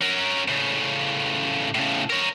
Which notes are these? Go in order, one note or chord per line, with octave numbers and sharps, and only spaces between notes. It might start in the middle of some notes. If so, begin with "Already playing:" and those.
C#4 A#4
A2 C#3
A2 C#3
A#4 C#5